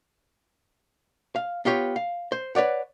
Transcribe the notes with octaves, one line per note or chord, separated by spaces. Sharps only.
F5
B3 F4 G4 C#5
F5
C5
B4 C#5 D5 F#5